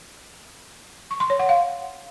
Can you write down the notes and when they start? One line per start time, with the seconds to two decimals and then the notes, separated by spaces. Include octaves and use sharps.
1.11 C#6
1.20 C6
1.30 C#5
1.39 F#5
1.49 F5